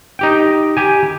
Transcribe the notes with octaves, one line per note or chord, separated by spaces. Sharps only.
D#4 G4 G5
G4 G#5